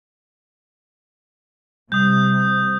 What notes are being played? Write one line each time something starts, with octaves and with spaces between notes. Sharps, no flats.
C3 G3 D#6 G6